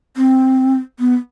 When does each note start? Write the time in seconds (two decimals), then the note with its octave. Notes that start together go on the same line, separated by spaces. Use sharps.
0.17 C4
0.99 B3